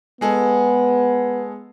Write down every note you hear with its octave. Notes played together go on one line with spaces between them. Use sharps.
G#3 B3 G#4 A4